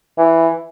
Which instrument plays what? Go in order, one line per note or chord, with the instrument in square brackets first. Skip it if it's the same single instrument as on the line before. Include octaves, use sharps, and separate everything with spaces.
[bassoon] E3